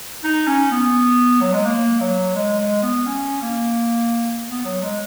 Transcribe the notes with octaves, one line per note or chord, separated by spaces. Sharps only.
D#4
C#4
B3
F#3
G#3
A#3
F#3
G#3
G#3
B3
C#4
A#3
B3
F#3
G#3